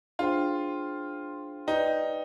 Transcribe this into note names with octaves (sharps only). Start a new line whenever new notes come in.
D4 F4 G#4 C5 G5 C6
D#4 G4 B4 D5 G5